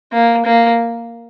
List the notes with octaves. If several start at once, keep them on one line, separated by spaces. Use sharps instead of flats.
A#3
A#3